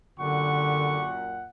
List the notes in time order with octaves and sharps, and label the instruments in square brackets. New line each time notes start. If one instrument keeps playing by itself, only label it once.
[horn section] F#2 A#2 F#5 [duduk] D3 [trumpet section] G4 C#6